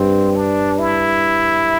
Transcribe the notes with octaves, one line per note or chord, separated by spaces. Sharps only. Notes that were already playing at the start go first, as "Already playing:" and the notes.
Already playing: G2 C4
D4
E4